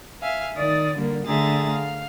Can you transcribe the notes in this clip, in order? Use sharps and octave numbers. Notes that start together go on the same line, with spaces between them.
E5 F5 G#5
D#3 D5 D#6 A6
D3 G3 A#3 A#4
D3 A3 G#4 E5 A#5 A6
F5